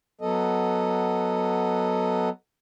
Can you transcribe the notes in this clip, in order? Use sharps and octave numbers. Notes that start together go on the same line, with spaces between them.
F#3 B3 A4 D#5